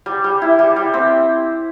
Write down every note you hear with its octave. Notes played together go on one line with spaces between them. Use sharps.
G3
G3
E4
G3
G3
C4